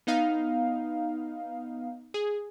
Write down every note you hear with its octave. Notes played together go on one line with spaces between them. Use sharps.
B3 D#4 F5
G#4